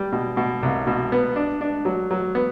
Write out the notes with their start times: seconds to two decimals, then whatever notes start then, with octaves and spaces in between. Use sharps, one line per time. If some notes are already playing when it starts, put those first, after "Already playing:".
Already playing: G3
0.12 B2
0.37 B2
0.63 C2
0.87 B2
1.12 B3
1.36 D4
1.61 D4
1.85 F#3
2.11 F#3
2.35 B3